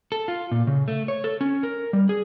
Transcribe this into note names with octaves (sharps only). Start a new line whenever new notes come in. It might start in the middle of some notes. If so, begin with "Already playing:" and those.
A4
F4
A#2
C#3
A3
C#5
A4
C#4
A#4
G3
G#4